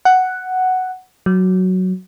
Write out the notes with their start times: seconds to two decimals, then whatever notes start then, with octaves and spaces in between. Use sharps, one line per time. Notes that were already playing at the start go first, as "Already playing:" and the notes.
0.05 F#5
1.26 F#3